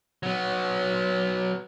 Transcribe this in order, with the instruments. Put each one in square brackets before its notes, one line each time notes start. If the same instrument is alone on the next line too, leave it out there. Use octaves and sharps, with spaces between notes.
[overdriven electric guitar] F#3 B3